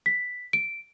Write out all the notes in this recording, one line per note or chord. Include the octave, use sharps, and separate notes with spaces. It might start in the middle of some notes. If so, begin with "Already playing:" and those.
B6
D7